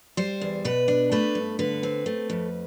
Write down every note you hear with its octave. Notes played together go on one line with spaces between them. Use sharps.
G3 C5
E2
B2 B4
D4
A3 B4
G2
D3 B4
C4
A3
F2